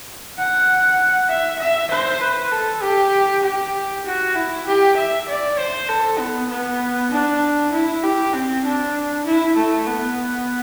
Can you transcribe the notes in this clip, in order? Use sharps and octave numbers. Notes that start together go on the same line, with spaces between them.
F#5
E5
E5
C5
B4
A4
G4
G4
F#4
E4
G4
E5
D5
C5
A4
B3
B3
D4
E4
G4
C4
D4
E4
A3
B3